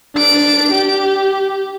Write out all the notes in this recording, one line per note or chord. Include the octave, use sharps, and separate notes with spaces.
D4 D7
G4